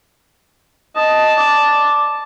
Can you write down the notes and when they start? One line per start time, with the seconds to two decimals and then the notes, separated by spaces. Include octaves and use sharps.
0.96 D#5 A5
1.37 D5